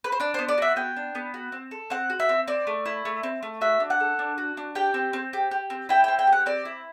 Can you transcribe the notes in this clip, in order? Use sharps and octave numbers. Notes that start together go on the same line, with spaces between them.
B4
C5
D4 D5
B3 C5
D5
F#4 E5
B3 G5
D4
B3
F#4
C4
A4
C4 F#5
F#4
E5
C4
C4 D5
A3
E4
A3
C4
A3
F#4 E5
D4
F#5
A4
D4
F#4
D4
G4 G5
C4
C4
G4
G4
C4
E4 G5
C4 G5
G5
G4
F#5
C4 D5
E4